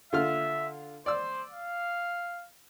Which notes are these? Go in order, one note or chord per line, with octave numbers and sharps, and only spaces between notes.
D3 F4 E5 F6
C5 D5 E6
F5